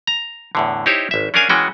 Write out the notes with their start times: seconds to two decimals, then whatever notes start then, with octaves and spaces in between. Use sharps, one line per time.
0.07 A#5
0.55 E2 A2 D3
0.86 D#4 E4 G4 C5 C#5
1.11 G#1 E5
1.34 C#4 D4 G#4 A#4 F5 G#5
1.49 E3 G#3 C#4 F#4 G5